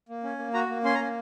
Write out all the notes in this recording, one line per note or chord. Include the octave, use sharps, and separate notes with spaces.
A#3
C#4
A#3
F#4 A#5
A#3
C#4 C6
A#5
A#3